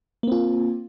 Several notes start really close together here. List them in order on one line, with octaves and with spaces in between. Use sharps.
A#3 C4 F4